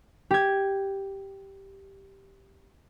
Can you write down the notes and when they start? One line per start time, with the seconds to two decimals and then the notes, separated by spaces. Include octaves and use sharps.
0.31 G4 G#6